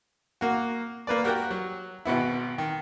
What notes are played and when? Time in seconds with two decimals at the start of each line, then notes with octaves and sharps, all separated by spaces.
0.41 A#3 F#4
1.07 A#3 B4 D5
1.24 F#4 G4 A#4 F#5 G5
1.51 F#3
2.05 G#1 B2 B3 E4
2.58 D#3